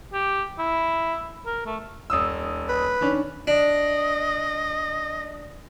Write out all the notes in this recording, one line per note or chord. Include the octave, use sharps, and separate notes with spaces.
G4
E4
A#4
A3
D#1 D#6 E6
B4
D#3 C#4 D4
D4 D#5